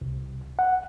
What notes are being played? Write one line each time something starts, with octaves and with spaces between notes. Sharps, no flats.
C2
F#5